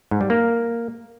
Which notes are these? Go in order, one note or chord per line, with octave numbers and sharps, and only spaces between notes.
G#2
G3
A#3